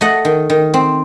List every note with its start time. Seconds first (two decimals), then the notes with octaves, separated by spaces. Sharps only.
0.01 A3 D#5 F#5
0.25 D#3
0.50 D#3
0.74 C4